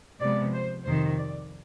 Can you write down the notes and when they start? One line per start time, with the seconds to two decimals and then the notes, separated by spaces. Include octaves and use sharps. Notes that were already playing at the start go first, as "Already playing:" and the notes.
0.20 C3 F3 G#3 B3 D5
0.53 C5
0.85 F2 C3 D#3 C5
1.17 D5